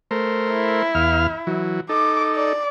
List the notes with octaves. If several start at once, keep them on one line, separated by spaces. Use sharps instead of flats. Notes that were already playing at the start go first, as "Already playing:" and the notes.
A3 A#4 C5
E4
E2 F5 F6
E3 F#3
D#4 A4 D6
D5